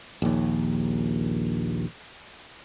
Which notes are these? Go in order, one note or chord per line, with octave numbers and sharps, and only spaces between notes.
A#1 D#2